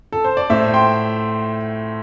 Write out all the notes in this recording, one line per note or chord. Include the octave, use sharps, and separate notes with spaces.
A4
C5
D5
A2 A3 C5 E5
G5 C6